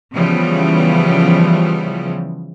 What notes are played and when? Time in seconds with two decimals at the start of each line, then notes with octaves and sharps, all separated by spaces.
0.14 C#3 E3 F3 G3 B3